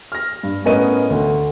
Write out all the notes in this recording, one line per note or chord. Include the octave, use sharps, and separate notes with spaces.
F6 A#6
G2
A2 B3 C#4 A#4 D#5 D#7
D2